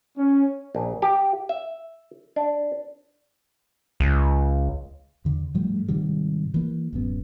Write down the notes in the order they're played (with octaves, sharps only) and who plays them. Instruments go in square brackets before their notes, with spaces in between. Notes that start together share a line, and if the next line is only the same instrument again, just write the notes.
[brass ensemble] C#4
[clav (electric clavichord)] A#1
G4
E5
D4
[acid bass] C#2
[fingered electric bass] E2 D3
G#2 F3 G3 A3
G#2 C3 D#3 G3
E3 A#3
D1 F#2 B3